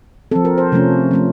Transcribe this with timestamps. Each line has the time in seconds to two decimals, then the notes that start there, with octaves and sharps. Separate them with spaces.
0.31 C4 A4
0.35 F3
0.45 A#4
0.58 C5
0.72 C3 F3 A3 C#4
1.11 F3 A3 C#4